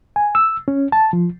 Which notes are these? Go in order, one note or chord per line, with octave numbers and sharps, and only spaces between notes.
G#5
E6
C#4
A5
F3